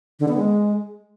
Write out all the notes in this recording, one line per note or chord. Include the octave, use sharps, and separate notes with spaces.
D3
B3
G#3